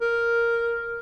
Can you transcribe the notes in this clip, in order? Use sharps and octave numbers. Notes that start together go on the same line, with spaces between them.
A#4